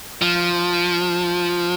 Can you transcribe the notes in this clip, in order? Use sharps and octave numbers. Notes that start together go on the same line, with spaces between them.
F3